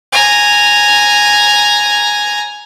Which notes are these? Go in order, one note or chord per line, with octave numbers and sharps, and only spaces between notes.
G#5 A#5